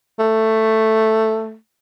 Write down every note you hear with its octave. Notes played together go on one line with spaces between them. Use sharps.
A3